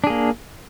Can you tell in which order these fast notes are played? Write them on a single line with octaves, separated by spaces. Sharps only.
D4 G#4 A#3